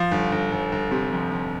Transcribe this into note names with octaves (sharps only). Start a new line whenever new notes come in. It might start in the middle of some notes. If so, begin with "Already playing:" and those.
Already playing: F3
G1
G1
G1
G1
C3
F2
F2